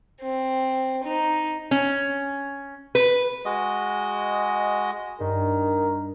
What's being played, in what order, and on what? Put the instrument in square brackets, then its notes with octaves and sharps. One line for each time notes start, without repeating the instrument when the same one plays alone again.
[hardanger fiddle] C4
D#4
[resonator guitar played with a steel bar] C#4
B4
[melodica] G#3 F#4 D#5
[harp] G2 [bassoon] D#3 [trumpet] A#4